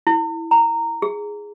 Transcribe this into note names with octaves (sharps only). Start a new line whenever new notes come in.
E4
A#5
G#4